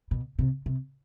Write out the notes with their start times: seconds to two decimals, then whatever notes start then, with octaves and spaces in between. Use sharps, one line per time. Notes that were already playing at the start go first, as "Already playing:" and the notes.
0.11 B2
0.39 C3
0.66 C3